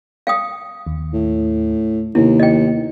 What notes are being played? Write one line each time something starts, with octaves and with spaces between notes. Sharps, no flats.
F5 G5 D#6
D#2
A2
D#2 C3 A#3 B3 E4
D#5 G5